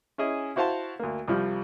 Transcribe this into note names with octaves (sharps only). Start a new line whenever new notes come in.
C#4 E4 G#4 D#5
E4 F#4 C5 F5 A5 C6
D2 A#3
C2 F3 G3